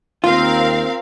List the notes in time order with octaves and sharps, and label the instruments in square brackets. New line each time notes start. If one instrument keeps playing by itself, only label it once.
[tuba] D#2 [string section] C4 A#4 F5 [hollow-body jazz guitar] F4